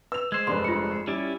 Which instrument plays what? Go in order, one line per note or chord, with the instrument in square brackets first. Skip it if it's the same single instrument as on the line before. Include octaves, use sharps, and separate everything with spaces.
[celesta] B4 [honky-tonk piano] E6 F7
[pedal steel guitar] G#3 C5 [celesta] G#6
[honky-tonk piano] F1 G2 B4 [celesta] C6
[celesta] F4 C#7
[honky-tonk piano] G3 [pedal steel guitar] C#4 E4 D5